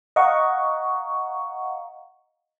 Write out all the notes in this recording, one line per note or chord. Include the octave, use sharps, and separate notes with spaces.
D#5 F5 F#5 A#5 C#6